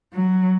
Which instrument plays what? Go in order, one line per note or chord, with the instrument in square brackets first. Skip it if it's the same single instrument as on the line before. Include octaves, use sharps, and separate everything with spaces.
[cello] F#3